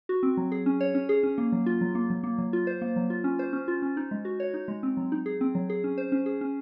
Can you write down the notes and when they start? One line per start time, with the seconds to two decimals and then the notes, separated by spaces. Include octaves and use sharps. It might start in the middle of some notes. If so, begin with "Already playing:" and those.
0.09 F#4
0.23 C4
0.37 F#3
0.52 G#4
0.66 C#4
0.81 C#5
0.95 C#4
1.09 G#4
1.23 C#4
1.38 A#3
1.52 F#3
1.66 F4
1.81 F#3
1.95 A#3
2.10 F#3
2.24 A#3
2.38 F#3
2.53 F4
2.67 C5
2.82 A#3
2.96 F#3
3.10 F4
3.24 C#4
3.39 C5
3.53 C#4
3.68 F4
3.82 C#4
3.97 D#4
4.11 G#3
4.25 F#4
4.40 C#5
4.54 D#4
4.68 G#3
4.83 C4
4.97 F#3
5.12 D#4
5.26 G#4
5.41 C4
5.55 F#3
5.70 G#4
5.84 C#4
5.98 C5
6.12 C#4
6.26 G#4
6.41 C#4